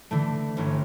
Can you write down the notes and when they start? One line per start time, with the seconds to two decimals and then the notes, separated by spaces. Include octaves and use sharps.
0.11 D3 E3 A3
0.57 G1 E3 C#4